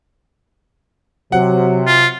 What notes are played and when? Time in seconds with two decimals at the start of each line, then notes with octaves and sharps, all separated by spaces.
1.32 C3 F#3 F#5
1.87 F4